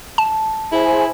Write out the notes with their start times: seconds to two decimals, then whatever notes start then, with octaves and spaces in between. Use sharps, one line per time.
0.18 A5
0.72 E4 G#4 C5 G#5